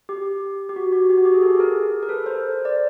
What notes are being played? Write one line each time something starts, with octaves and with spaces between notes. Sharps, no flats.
G4
G4
F#4
F#4
G4
F#4
G4
G#4
G4 A4
G#4 A#4
A#4
A4 B4
A#4 C5
D5